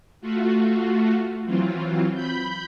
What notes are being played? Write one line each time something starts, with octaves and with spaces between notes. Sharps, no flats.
A3 F4 F#4
E3 F#3 C4 F4
B5 G6